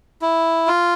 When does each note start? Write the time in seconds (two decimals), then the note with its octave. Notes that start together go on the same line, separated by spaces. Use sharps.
0.22 E4
0.67 F4